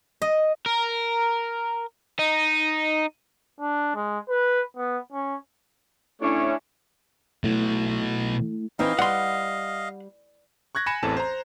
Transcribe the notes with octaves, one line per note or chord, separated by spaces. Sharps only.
D#5
A#4
D#4
D4
G#3
B4
B3
C#4
A3 C#4 D4 E4 C#5
B2 F#3 A3 E4
E3 C4 D#4 D#5 F5
G3 F#5 C6
C#6 F#6 G#6 A#6
G#5 B5 G#6 A#6 C#7 E7
A1 E2 E3 C4 A4 A5
C5 A#5